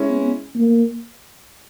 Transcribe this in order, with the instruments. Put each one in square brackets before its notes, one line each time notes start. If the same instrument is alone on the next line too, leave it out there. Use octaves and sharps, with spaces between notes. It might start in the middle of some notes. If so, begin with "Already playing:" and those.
Already playing: [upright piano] G#3 C#4 E4
[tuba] B3
A#3